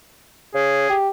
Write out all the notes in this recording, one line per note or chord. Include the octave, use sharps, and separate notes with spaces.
C#3 G#4
G4